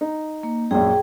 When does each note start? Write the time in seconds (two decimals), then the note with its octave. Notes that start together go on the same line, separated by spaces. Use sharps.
0.01 D#4
0.43 A#3
0.71 A#1 F#2 G#4 G5